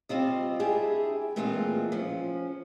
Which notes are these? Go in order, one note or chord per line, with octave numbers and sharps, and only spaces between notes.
G3 C4 F4 D#5
D4 E4 G4 G#4
A#2 E3 G#3 A3 C4 F4
F3 C#4